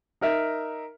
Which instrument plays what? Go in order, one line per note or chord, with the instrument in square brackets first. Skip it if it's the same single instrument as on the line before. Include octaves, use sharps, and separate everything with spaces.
[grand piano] D#4 A#4 E5